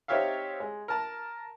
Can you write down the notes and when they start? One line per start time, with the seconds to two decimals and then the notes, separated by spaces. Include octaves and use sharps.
0.08 C4 D#4 G4 C#5 E5 F5
0.60 G#3
0.88 A#4 A5 A#5